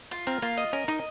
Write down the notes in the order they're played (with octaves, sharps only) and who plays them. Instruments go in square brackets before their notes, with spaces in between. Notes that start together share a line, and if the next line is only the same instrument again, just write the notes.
[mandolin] F4
[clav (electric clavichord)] C4 [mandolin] A#4
[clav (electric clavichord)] A#3 [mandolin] F4
[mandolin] D#5
[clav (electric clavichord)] C#4 [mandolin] A#4
[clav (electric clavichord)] D#4 [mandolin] D#5